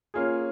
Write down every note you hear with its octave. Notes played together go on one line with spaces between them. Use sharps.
A#3 C#4 F4 G#4